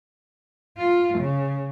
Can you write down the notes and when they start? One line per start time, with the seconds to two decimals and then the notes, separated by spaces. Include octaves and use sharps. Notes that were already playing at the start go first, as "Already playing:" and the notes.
0.78 F4
1.18 C#3